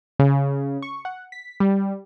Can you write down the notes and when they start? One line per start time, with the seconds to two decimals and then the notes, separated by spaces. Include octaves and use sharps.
0.19 C#3
0.82 C#6
1.05 F#5
1.32 B6
1.60 G3